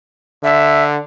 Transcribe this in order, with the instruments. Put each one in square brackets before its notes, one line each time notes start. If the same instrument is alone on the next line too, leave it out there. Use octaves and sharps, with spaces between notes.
[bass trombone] D3 [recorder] E5